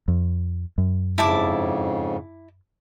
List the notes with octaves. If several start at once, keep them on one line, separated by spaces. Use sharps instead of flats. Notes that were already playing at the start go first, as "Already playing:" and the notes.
F2
F#2
F2 G#2 C#3 E4 A5 D6